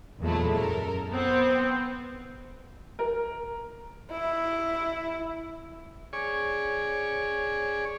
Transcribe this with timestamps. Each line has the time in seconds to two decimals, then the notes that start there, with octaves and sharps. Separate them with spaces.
0.21 E2 A#2 F#3 G#3 A3 E4
0.53 F#2 A4 A#4
1.11 B3 C4
2.99 A#4
4.11 E4
6.13 G#4 C#5 D5 G#5 C#6